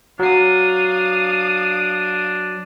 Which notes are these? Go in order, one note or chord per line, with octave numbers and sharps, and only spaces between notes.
F#3 D4 F5 D#6 C7